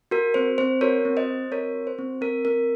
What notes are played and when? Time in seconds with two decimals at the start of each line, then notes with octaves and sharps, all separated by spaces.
0.11 F#4 A#4
0.34 C4 C5
0.58 C4 C5
0.81 F#4 A#4 C#5
1.05 C4
1.17 C5 D#5
1.28 F#4
1.51 C4 A#4 C#5
1.74 F#4
1.87 C5
1.99 C4
2.21 C4 A#4
2.45 C4 A#4